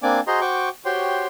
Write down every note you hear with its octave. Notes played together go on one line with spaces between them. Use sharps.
A#3 C4 D4 D5 G#5 D6
F#4 G#4 C5 D#5 A#5 C6
F#4 C5 G5 C#6 D6
F#4 G4 C5 C#5 G5 C6